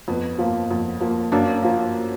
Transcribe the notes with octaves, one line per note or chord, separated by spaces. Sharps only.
F2 B3
F3 A#3
F2
F3 A#3
F#2 A#3 D4
F3 A#3